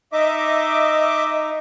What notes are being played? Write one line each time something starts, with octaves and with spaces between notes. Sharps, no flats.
D#4 D#5 E5 D6